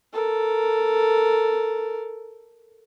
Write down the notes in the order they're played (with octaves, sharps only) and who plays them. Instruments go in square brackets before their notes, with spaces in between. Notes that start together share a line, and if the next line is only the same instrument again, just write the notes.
[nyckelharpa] A4 A#4